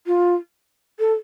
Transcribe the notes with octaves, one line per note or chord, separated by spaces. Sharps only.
F4
A4